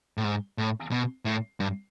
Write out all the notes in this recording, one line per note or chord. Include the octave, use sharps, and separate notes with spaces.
A2
G#2
A2
B2
A2
G2